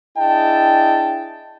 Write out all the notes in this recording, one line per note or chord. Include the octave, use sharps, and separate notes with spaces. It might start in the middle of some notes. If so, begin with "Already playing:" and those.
D4 E4 G#4 D#5 G5 A5